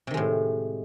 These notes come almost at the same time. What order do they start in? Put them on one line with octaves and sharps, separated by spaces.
C3 D#3 G#3 A2